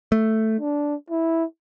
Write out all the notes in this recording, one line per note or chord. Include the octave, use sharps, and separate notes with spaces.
A3
D4
E4